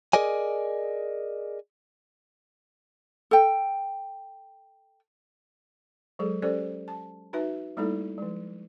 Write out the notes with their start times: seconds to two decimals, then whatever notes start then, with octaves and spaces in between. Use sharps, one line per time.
0.13 G#4 A#4 D5 D#5 G#5
3.31 A4 G5
6.19 F#3 G#3 G#4 A4
6.42 C#4 G4 A4 C5 D5
6.88 A5
7.33 D#4 F#4 B4 E5
7.77 G3 A3 A#3 D#4 E4 A4
8.18 F3 G#3